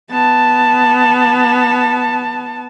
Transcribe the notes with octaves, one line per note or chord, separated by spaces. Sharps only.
B3 A5